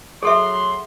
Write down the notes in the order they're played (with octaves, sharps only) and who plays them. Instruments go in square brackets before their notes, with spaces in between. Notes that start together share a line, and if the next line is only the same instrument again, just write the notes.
[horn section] F#3 C6 [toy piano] G#4 A4 E5